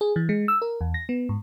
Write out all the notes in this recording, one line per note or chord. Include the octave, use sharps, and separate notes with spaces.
G#4
E3
G#3
E6
A#4
E2
A#6
B3
G#2